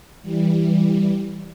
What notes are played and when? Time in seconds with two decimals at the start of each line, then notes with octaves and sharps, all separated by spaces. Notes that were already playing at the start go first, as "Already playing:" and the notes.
0.22 E3 G3